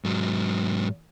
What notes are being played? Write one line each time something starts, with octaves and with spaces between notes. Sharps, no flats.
G#2 F#3